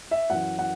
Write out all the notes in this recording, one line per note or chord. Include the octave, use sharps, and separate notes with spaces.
E5
F#2 E3 F#5
F#5